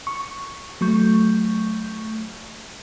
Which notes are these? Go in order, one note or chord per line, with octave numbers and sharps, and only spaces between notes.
C#6
F#3 A3 C#6 G6